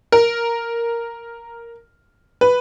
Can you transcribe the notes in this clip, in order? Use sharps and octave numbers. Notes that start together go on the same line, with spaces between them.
A#4
B4